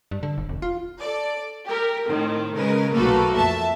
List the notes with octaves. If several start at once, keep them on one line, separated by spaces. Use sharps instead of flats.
G2
D3
G1
E1
F4
A4 D5
G4 A#4
A2 D#3 C4
C#3 G#3 A#4 B4
B1 A3 A#3 F#4 A4 B4
F2 E5 A5